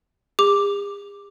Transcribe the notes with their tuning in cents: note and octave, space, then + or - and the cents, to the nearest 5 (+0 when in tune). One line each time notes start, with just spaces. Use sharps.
G#4 -45 D6 +0